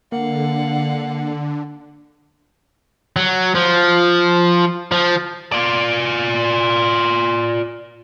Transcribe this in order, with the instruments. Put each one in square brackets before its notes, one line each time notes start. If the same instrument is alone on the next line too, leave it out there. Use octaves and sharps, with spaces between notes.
[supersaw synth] D3 [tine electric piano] A#3 [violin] F5 F#5
[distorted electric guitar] F#3
F3
F3
[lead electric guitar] F4 D5